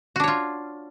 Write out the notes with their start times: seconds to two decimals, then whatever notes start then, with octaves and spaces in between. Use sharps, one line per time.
0.16 F#4
0.20 D4
0.24 C#5
0.28 F4